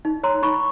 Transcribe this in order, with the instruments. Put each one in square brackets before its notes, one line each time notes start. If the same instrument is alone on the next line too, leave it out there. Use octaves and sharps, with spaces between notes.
[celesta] D#4
C#5 A#5 C6
D#4 B5 C#6